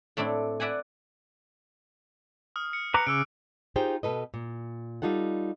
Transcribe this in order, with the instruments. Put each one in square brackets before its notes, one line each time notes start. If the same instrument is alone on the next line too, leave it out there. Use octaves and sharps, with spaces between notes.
[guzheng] A2 A3 C4 D4 E4
B4 D5 E5 F#5 G#5
[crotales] D#6 F6
C#7
[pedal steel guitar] B4 A#5 D6 [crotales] F#6 C#7
[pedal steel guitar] C#3 [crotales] D6 E6 D7
[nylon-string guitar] D#4 F4 G4 G#4 C5 G5
B2 A4 B4 D#5
A#2
G3 D#4 F4 A4 F#5